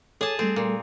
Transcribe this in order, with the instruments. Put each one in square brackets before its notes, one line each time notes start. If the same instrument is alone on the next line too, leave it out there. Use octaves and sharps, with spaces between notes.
[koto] G#4 A5 [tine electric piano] A4 C#5 D6
[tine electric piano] G3 A3 A4 [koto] C4
[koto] A#2